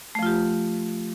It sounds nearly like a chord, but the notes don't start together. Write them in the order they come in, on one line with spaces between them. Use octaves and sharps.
A3 F3 F4 G4